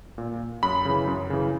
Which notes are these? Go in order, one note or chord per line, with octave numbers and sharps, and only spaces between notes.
A#2
F#2 B5
C#3 E3
F#2
C#3 E3